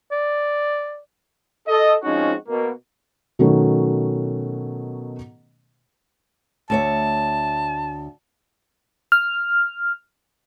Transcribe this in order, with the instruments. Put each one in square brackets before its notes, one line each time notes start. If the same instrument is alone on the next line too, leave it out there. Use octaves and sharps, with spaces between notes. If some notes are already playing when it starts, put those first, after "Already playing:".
[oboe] D5
[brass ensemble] A4 D#5
F3 G#3 C4 C#4 D#4 F#4
B2 A#3
[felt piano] B2 D#3 F#3 A3 B3 C#4
[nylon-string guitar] D2 C#5 E5 [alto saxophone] A5
[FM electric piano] F6